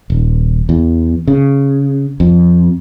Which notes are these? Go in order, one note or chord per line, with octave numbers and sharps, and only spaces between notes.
D#1
E2
C#3
F2